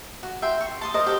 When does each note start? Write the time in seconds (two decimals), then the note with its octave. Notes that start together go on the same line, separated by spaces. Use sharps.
0.23 F#4
0.42 E5 G5 C6
0.61 C#6
0.81 A5 C6 D#6
0.94 A#4 C5 D#5
1.06 G4 A4